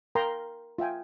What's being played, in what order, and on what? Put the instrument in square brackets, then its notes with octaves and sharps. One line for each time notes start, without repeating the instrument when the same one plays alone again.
[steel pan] A#4 F5 G5 A#5 C6
F4 E5 G5 G#5